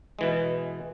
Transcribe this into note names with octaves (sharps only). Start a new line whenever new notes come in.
B2 E3 G#3